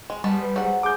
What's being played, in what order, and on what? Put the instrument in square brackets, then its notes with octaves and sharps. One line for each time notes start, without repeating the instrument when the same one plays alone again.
[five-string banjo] G#3
[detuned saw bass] G3 [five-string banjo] G#3 B3 A5
[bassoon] B4
[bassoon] G#2 [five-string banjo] F#3 F#5
[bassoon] G#4 [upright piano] D6 G6